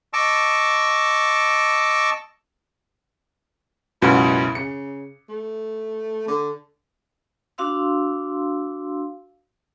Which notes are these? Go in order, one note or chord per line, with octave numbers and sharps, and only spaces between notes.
D#5 A5 C#6 D6 E6
C#2 F#2 B2 E4
C#3 C#7
A3
D3
D4 F#4 F5 C6 E6